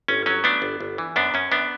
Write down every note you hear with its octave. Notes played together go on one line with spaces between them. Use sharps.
G1 C#4
F#3 C#4
A3 B3 D4
G1
G1
E3
F#2 B3 D4
F#2 C#4
F#2 B3 D4